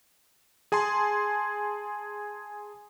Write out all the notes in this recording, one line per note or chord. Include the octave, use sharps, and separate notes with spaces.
G#4 G#5 A5 C6